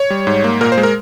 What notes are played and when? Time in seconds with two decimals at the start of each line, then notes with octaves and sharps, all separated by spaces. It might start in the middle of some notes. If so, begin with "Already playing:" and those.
Already playing: C#5
0.10 G3
0.27 G#2
0.44 A#3
0.61 A#2 A#4
0.72 C5
0.77 G#3
0.83 A#4